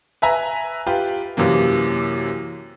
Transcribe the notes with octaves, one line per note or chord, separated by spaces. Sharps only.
B4 E5 G#5 A#5
F4 G4 B4
F#2 C3 E3 A#3